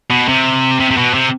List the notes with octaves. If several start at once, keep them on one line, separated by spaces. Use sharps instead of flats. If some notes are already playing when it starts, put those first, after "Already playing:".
B2
C3
C3
C3
B2
C3